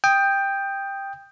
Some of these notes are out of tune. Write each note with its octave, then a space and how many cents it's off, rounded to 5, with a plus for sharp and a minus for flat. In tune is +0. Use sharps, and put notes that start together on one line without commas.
G5 +10 D#6 +0